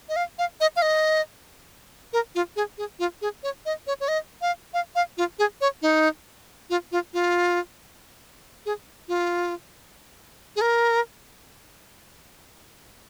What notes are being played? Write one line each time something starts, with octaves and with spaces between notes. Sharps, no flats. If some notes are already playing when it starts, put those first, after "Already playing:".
D#5
F5
F5
D#5
F5
D#5
A#4
F4
G#4
G#4
F4
G#4
C#5
D#5
C#5
C#5
D#5
F5
F5
F5
F4
G#4
C#5
D#4
F4
F4
F4
G#4
F4
G#4
A#4